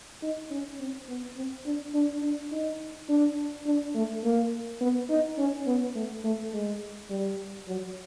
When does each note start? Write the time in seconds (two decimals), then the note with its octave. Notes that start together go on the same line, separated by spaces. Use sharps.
0.23 D#4
0.51 C#4
0.80 C4
1.09 B3
1.37 C4
1.65 D4
1.94 D4
2.23 D4
2.52 D#4
3.09 D4
3.66 D4
3.95 A3
4.24 A#3
4.81 B3
5.10 D#4
5.38 C#4
5.67 B3
5.96 A3
6.25 A3
6.53 G#3
7.10 G3
7.68 F#3